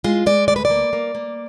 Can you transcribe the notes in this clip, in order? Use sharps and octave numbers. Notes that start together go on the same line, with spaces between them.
G#3 F4
G#3 D5
D2 D5
B4
D5
A#3
A#3
A#3